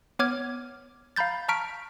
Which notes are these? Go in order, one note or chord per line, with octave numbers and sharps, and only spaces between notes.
B3 C#5 D6 F6 G#6
F5 A#5 B5 G6 A6
A5 A#5 C#6 F6 B6 D7